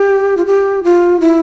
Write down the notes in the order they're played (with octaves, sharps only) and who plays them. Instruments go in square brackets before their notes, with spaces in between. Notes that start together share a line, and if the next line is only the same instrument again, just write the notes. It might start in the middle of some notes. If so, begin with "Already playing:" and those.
Already playing: [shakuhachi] G4
F4
G4
F4
E4